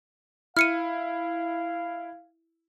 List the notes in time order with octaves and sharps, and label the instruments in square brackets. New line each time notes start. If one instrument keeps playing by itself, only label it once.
[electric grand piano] E4 [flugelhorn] F5 [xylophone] F6 C#7 D#7